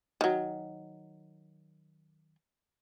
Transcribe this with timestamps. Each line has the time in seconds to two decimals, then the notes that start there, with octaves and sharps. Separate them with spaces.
0.21 D#3 F#3